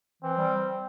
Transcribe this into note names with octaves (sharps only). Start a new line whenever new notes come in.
E3 C4
G3